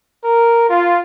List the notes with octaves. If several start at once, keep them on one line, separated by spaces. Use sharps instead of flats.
A#4
F4